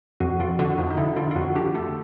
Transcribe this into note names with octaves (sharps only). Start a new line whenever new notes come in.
F2 F#4
F2 F4
D3 F#4
F2 D#4
D#4
D3 E4
D3 F4
F4
F2 F#4
D3 G4
A3 A4